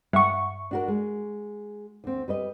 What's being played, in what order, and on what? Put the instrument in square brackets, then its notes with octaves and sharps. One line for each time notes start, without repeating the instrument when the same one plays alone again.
[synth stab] G2 C#6 [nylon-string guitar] E5 F#5
[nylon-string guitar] D4 F#4 A#4
G#3
D2 C4
G3 B4 D#5